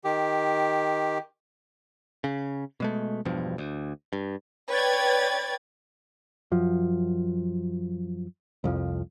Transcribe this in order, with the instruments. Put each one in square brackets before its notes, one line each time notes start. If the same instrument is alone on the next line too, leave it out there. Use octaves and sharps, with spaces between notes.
[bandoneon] D#3 G4
[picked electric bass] C#3
B2 G#3 A3
E1 G2 B2 F3
D2
G2
[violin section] B4 C#5 D5 G5 G#6 A6
[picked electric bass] F#2 F3
C2 F2 F3